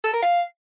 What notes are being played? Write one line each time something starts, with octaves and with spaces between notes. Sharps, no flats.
A4
A#4
F5